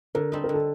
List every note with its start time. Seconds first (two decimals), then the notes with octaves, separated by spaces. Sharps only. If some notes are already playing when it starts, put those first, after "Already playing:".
0.15 D3 A#4
0.32 G3 C4 D#4 A4
0.44 A#4
0.49 D3 A4